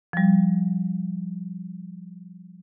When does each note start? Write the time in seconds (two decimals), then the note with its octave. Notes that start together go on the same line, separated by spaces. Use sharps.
0.13 F3 G3